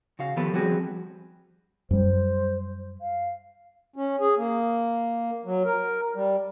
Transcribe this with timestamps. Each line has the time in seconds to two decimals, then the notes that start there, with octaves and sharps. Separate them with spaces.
0.19 C#3 F#4 F5
0.36 D#3 F3 B3 G4 A4 B4
0.53 F3 G3 C4 F#4 G#4 B4
1.91 F#2 G3 C5
3.01 F5
3.96 C#4
4.20 G#4
4.38 A#3
5.45 F#3
5.65 A#4
6.15 G3